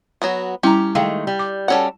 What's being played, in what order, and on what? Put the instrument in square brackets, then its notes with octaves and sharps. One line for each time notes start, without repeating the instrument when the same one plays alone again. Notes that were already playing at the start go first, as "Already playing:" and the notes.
[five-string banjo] F#3 B3 F#4
[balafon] G3 E4 [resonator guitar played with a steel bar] C#4 A#5 [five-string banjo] G4
[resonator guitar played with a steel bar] D#3 G#3 A3 [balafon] F5 G5
[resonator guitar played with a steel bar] G3
[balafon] D6
[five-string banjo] G3 C#4 F#5 [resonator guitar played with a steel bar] F#4 A4